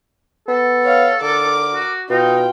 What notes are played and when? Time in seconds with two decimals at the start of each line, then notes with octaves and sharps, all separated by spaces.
0.48 B3 A4
0.84 C#5 F5
1.21 D3 A#4 D6
1.73 F#4
2.10 B2 D#4 F4 G5